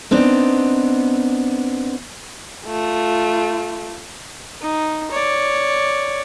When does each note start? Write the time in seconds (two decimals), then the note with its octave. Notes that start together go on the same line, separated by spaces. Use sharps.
0.11 B3 C4 D4 D#4
2.67 A3 F4
4.61 D#4
5.11 C#5 D5